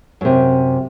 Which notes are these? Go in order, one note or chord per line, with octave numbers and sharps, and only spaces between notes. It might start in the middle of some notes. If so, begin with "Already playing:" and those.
F#2 C3